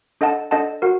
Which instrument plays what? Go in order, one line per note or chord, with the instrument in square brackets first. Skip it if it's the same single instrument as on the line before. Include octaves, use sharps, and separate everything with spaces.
[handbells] D4 A4 D#5 F#5 A5
D4 A4 D#5 F#5 A5
F#4 A#4 F#5